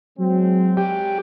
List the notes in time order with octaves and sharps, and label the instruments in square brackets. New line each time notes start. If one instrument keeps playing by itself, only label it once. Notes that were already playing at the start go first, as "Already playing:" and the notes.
[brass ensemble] F#3 G#3 C4
[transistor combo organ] G4